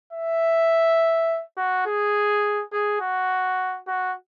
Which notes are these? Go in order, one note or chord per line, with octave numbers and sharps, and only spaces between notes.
E5
F#4
G#4
G#4
F#4
F#4